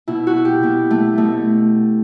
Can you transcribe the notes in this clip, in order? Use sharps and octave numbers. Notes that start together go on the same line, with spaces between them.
B2 E4
F#4
G4
B2 B3
A3
B2 A3